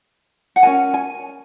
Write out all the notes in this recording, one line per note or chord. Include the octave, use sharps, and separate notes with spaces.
F#5
C#4 F#4 A#4 G#5
G#5